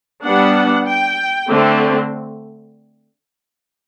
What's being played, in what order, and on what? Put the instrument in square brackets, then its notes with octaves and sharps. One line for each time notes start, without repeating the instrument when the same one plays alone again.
[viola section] G3 B3 D4 F#5
G5
D3 A3 C4